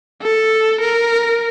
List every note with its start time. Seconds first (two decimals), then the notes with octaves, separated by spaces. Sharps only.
0.22 A4
0.81 A#4